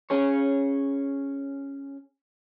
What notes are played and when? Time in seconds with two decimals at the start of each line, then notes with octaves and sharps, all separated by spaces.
0.10 C#4 G#4 C#5